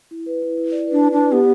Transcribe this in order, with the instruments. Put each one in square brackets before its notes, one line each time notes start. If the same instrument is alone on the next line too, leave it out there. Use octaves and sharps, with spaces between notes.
[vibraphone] E4
B4
E4
E4
D5
[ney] D4 [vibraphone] B4
[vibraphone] B4
[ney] D4
[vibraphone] B4
[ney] B3 [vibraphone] G4